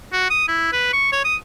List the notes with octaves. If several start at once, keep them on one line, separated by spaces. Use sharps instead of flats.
F#4
D#6
E4
B4
C#6
C#5
D#6